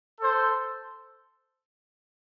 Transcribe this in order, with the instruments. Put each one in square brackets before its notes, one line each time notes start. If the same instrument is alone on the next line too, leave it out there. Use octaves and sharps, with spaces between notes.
[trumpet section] A4 C5